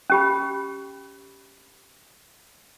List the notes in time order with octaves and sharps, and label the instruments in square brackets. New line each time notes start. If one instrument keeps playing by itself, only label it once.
[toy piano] C#4 G4 B5